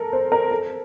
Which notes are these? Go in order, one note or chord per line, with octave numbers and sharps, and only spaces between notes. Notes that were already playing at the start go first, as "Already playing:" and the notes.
Already playing: A4 A#4
C5
A#4
A4